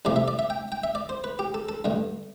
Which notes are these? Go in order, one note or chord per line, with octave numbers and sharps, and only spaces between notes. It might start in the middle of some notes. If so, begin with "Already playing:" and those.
C2 C3 F3 A3 D5
E5
D5
E5
G5
G5
E5
D5
C5
B4
G4
A4
A4
G2 D3 A3